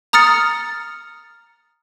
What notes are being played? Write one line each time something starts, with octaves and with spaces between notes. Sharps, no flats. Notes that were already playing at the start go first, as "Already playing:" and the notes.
A#5 D#6 F6 A6 C#7